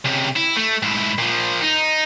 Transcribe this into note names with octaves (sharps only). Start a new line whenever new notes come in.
C#2 C3
E4
A3
G#2 E4
A#2 F3
D#4